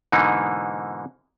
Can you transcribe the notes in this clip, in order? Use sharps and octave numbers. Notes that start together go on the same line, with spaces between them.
G#2 B2 D3 E3 A#3 D#4